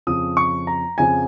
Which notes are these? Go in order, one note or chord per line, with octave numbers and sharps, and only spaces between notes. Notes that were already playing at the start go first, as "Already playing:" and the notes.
F2 C#3 F3 D#6
C#6
A#5
F2 C#3 F3 G#5